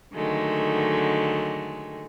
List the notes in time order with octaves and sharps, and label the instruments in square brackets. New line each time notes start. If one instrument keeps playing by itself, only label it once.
[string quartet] D3 D#3 F#3 G#3 A3